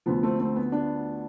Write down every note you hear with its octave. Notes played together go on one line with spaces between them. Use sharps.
D2 D3 F3 B3
A3 C4
A3 C4
B3
B3 D4